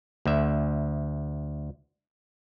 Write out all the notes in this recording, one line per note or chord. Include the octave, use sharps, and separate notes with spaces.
D2 E5